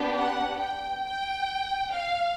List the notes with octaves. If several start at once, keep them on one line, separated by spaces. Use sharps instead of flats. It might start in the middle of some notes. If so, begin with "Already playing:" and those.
Already playing: B3 D4 G4
F#5
G5
G5
F5